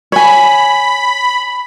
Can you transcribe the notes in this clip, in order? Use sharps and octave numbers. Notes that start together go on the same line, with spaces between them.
C#5 G#5 B5